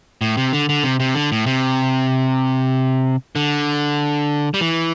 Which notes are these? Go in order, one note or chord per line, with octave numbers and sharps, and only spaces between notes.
A2
C3
D3
D3
C3
C3
D3
A2
C3
D3
G3
E3